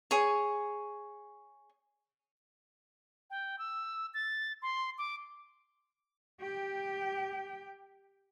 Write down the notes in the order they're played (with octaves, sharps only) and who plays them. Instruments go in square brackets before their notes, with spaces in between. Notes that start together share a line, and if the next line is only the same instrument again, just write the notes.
[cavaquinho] G#4 C#5
[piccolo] G5
E6
A6
C6
D6
[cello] G4 G5